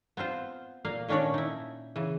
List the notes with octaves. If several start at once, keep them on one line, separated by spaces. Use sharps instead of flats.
B3 C4 F4 C5
A#2 A#3 F5
A#2 D#3 C#4 D4 C#5 D5
D#4 E4
C#3 E3